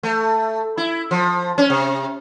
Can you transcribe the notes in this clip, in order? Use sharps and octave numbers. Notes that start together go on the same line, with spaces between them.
A3
E4
F3
C#4
C3